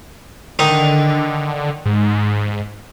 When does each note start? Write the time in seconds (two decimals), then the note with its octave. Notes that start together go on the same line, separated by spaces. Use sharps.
0.59 D3 D#3 D#4
1.86 G#2